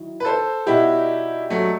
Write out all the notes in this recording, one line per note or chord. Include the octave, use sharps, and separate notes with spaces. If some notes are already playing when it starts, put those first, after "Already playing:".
Already playing: D#3 F#3 E4
B4
A4 C5
B2 G3 D#4 E4 F#4 G4
F#3 A3